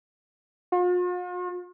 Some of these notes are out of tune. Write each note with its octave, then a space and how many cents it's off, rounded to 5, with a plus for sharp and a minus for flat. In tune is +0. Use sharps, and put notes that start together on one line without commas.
F4 +45